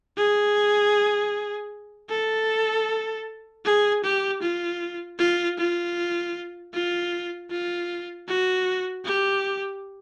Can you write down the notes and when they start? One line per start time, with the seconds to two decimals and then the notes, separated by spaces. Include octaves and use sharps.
0.17 G#4
2.10 A4
3.65 G#4
4.03 G4
4.42 F4
5.18 F4
5.58 F4
6.73 F4
7.51 F4
8.28 F#4
9.05 G4